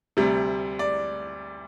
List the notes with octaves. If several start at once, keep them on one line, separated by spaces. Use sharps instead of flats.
D2 C3 G3
D5